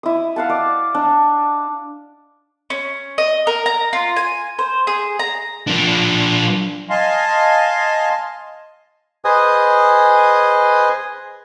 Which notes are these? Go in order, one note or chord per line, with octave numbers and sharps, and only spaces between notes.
E4 D#6
F5 F#5 A5
D5
D4
C#4
D#5
A#4
A#5
F4
G#5
C5
G#4
A#5
F3 D4
D#5 F5 G#5 A5 C6
G#4 B4 C5 D#5 G#5 D#6